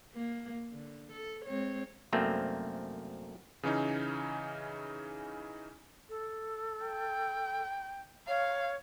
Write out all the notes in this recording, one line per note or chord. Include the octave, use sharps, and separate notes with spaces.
A#3
D3
A4
G#3 C4 C#5
C2 F#2 A3 A#3 C4
C#3 E3 C#4 D#4
A4
G5
C#5 F5